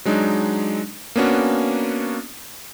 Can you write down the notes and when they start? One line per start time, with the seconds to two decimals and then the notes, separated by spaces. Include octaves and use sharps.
0.05 F#3 G#3 D4 D#4
1.16 A#3 B3 C#4 D4 F#4